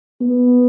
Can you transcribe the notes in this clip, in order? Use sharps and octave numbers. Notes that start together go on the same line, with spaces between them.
B3